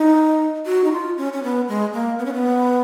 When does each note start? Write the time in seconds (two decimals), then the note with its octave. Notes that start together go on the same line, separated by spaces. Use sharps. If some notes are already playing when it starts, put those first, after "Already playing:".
Already playing: D#4
0.66 F#4
0.84 D#4
0.92 F4
1.18 C#4
1.33 C#4
1.43 B3
1.68 G#3
1.93 A#3
2.19 B3
2.26 C#4
2.33 B3